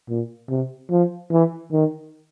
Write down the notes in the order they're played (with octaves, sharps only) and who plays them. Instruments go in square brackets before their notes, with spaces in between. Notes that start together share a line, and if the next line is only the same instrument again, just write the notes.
[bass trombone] A#2
C3
F3
E3
D#3